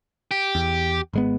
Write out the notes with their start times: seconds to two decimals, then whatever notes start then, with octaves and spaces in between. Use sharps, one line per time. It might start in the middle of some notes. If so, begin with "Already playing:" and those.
0.31 G4
0.55 E2
1.13 G#1 G#3 B3